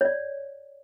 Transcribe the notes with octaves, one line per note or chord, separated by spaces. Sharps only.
C#5 D5